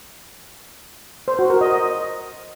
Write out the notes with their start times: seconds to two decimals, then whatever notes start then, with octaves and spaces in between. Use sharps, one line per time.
1.28 C5
1.39 F#4
1.50 A#4
1.61 D#5
1.72 D#5